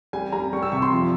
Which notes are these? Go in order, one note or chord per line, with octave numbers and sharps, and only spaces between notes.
G3 G#5
G3 A#5
G3 C#6
E6
C3 C#6
C6
F3